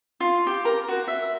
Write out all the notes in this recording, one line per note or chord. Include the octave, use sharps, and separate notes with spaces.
F4
G4
A#4
F#4
E5